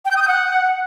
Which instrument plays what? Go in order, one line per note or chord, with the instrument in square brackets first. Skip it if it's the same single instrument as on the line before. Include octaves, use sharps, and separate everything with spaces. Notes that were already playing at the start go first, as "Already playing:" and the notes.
[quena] G5
G6
D#6
G6
F#5